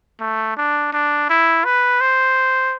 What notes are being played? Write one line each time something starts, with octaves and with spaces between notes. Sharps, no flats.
A3
D4
D4
E4
B4
C5